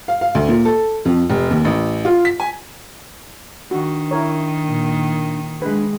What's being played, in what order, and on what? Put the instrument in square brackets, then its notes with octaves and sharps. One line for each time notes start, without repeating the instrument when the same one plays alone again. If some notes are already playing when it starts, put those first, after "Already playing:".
[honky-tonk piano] F5
F5
D2
A#2
A4
F2
F1
D#2
A1
F4
B6
G#5
[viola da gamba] D#3 [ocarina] D4 [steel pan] F#4
[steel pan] E4 A#4 C#5
[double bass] A#2
[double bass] G#3 [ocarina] D4 [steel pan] B4